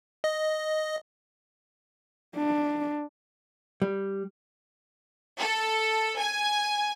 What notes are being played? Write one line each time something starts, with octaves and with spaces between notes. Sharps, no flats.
D#5
D4
G3
A4
G#5